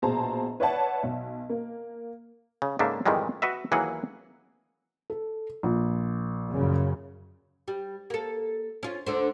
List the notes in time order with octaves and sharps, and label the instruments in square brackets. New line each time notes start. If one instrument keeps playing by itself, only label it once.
[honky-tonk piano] A#1 B2 G#4 C5 A5 A#5
B4 C#5 D5 E5 F#5 A5
B1
A#3
[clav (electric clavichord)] C#3
G#2 C#3 A3 A#3 D4 E5
F2 G#2 D#3 E3 G3 G#3
F#4 B4 D#5 E5
D#2 E3 F#3 A#3 G#4 F#5
[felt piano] A4
A#1
[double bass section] F#2 C#3
[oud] G3
A#3 A4
C#4 F4
D2 D3 C5